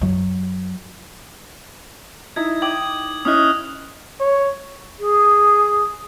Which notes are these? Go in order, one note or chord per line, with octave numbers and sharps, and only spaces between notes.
F#2 F#3
D#4 E4 G#6
G5 D6 D#6 G#6 F#7
C#4 E4 D#5 D#6 F6 F#6
C#5
G#4